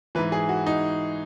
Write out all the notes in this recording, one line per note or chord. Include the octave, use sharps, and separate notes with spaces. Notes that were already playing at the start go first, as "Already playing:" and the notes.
G#2 E3 B4
G#4
F#4
D#4